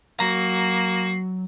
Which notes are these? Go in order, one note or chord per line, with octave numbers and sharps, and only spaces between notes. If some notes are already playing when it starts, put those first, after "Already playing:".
F#3 A#3 F#4 A#5 C7